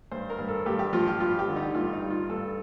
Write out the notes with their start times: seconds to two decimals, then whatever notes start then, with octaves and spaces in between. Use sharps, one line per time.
0.12 G2 C5
0.30 A#4
0.38 G2
0.48 A4
0.66 G2 G4
0.79 G4
0.93 F3 F4
1.07 G4
1.20 G2 F4
1.39 G4
1.48 D3
1.56 D#4
1.75 G2 F4
1.93 D#4
2.02 G3
2.10 F4
2.29 G2 A4